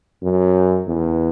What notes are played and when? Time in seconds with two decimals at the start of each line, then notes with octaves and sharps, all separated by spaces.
0.23 F#2
0.88 E2